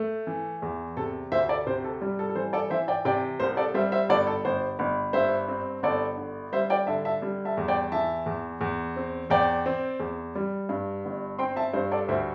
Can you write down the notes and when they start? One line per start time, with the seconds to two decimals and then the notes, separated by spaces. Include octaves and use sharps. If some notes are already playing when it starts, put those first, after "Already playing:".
Already playing: A3
0.27 E3
0.62 E2
0.97 C3 A4
1.32 D2 C5 E5
1.49 A4 D5
1.66 C3 C5
1.84 A4
2.02 G3
2.19 A4
2.30 A4
2.35 E3 C5
2.53 A4 D5
2.70 E3 C5 E5
2.88 D5 G5
3.05 C3 D5 G5
3.40 C2 C5
3.57 A4 D5
3.74 G3 C5 E5
3.92 C5 E5
4.09 G1 A4 D5
4.27 A4
4.45 G1 C5
4.79 G1
5.13 G2 C5 E5
5.48 C4
5.83 G1 A4 D5
6.17 D3
6.53 G3 C5 E5
6.70 D5 G5
6.87 D3 E5 A5
7.05 E5 A5
7.22 G3
7.45 E5 A5
7.57 E2
7.68 D5 G5
7.92 E3 E5 A5
8.26 E2
8.61 E2
8.96 C4
9.30 E2 D5 G5
9.66 C4
10.00 E2
10.35 G3
10.69 G2
11.05 G1
11.39 C4 G5 C6
11.56 E5 A5
11.74 G2 C5
11.91 A4 D5
12.08 D2 C5 E5